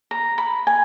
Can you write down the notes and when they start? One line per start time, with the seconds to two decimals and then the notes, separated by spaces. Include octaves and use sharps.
0.11 A#5
0.38 B5
0.67 G#5